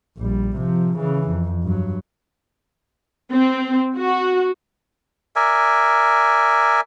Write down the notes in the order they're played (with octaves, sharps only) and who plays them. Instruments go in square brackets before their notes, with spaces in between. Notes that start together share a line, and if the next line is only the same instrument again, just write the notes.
[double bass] A#1 G3
C3 F3
C#3 E3
F2
G2 F#3
[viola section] C4
F#4
[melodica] A#4 D5 E5 G#5